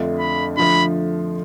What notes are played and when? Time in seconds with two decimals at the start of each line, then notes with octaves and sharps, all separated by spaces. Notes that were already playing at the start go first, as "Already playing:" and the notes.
Already playing: F2 D3 A3 D4 F4
0.20 B5
0.57 D3 F3 A3 B5